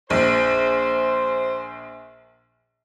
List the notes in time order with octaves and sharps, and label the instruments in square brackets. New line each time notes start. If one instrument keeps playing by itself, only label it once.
[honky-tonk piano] A#1 [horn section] C5